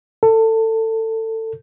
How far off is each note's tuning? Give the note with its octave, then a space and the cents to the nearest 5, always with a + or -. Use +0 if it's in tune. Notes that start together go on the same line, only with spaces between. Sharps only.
A4 +25